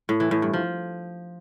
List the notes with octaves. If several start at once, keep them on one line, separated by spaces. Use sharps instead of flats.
A2
E3
A2
G2
F3